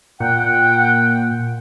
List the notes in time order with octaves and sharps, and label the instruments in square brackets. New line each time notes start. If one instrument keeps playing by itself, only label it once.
[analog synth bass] A#2 [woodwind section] F#5 G5